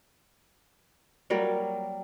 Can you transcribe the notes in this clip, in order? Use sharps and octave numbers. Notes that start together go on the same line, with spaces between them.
F#3 G3 A#3